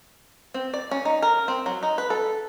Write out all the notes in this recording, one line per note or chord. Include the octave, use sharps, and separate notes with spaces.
C4
D5
C#4
D#4
A#4
C4
F#3
D#4
B4
A4